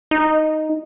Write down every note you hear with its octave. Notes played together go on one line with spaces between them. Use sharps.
D#4